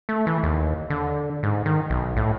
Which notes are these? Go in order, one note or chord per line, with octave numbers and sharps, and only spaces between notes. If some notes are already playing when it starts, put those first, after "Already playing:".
A3
E3
D#2
D3
G#2
D#3
B1
A2